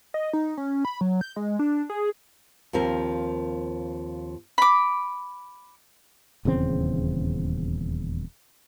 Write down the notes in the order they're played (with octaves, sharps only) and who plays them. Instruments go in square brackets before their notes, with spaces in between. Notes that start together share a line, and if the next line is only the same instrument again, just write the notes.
[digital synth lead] D#5
D#4
C#4
B5
F#3
G6
G#3
D4
G#4
[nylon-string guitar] D#2 F3 C4 A#4
[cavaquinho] B5 D6
[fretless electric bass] D#1 E2 C#3 C4